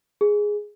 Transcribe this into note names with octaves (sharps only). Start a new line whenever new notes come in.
G#4